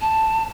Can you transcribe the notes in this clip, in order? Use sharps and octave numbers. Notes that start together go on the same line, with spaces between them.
A5